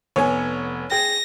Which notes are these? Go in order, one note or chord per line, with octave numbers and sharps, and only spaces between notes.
F1 B3 C#5 G#5
G#4 G5 A#6